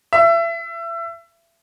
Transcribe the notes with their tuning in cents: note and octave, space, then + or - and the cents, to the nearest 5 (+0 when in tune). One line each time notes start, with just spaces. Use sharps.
E5 +30